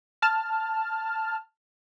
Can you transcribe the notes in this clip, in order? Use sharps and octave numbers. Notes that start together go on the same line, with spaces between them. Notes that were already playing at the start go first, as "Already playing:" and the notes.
A5 F6